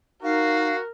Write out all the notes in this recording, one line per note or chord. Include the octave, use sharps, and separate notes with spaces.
D#4 F#4 A#4 F5